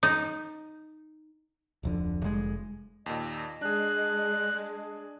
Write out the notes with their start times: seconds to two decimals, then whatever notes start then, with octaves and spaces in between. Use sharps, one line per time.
0.03 D#4
1.83 D1 F2 D3
2.22 F1 G3 G#3
3.06 D#2 A#2 D#5
3.61 G#3 D4 G#4 F#6